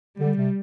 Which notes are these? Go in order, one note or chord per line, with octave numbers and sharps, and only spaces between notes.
D3 G3
C3